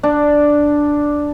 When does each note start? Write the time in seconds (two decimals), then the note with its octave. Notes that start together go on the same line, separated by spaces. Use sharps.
0.03 D4